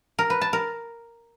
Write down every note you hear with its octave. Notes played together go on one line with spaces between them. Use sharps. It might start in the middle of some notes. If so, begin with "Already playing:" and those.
A#4
B4
A5
A#4